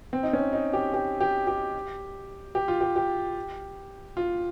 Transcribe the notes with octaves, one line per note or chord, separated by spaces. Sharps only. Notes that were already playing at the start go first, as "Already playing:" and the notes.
C4
D#4
C#4
D#4
G4
G4
G4
G4
G4
F4
G4
G4
F4